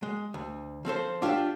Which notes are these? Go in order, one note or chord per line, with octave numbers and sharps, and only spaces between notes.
G#3
D2
F3 C4 A4 C5
D4 F4 G4 C5 E5